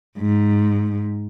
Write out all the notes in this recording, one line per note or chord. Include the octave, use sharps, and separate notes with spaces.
G#2